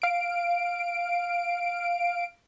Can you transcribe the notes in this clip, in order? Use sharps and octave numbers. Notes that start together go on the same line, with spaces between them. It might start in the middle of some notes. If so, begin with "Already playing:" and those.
F5 D7